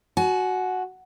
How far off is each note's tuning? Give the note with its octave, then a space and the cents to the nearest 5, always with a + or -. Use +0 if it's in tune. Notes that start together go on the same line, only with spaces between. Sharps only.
F#4 +0 G#5 +35